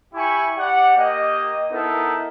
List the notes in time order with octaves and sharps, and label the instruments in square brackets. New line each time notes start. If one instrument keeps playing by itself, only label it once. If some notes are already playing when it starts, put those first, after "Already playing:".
[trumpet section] E4 G4 G#5 B5 C#6
G4 D5 F#5
A#3 G4 D#5
B3 D#4 E4 A4 A#4